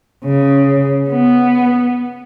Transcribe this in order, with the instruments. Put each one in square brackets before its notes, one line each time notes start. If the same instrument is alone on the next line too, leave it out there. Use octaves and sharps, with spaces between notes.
[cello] C#3
B3